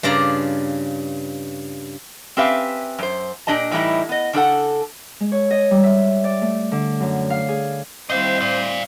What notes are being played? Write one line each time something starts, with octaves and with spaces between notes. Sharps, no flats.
G2 C#3 F4 D5 A#5
C4 C#4 G4 B4 E5 F5
F#2 C5
A#2 D4 G4 D#5 A5
A2 E3 G3 D#4 E4
B3 D#5
C#3 D4 F4 A4 F#5
G#3
C#5
D#5
G3
E5
D5
A3
D3
F#2
F5
G#4
G3 C4 E4 C5 D#5 F5
D5 F5